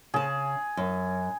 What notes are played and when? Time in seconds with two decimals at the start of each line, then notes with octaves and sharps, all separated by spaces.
0.14 C#3 G#4 A5
0.77 F#2